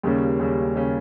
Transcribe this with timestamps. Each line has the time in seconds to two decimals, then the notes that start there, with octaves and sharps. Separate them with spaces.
0.03 D#2 C#3 G3 A#3 C#4
0.40 D#2 C#3 G3 A#3 C#4
0.76 C#3 G3 A#3 C#4